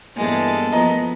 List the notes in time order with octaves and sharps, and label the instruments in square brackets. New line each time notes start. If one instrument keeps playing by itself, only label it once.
[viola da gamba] E2 G2 B3 [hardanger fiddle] G#3 A4 [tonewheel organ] A#3
[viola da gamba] F3 B3 [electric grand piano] D#5 A#5